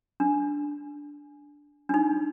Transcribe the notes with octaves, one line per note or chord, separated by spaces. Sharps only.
D4
D4
D#4